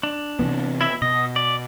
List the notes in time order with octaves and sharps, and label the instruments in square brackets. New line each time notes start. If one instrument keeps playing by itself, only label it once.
[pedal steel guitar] D4
[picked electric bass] C3 E3 B3
[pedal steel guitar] E4 E5
[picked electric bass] B2 [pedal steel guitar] D#5
[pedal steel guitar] D5